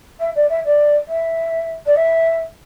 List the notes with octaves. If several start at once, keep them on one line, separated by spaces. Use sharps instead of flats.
E5
D5
E5
D5
E5
D5
E5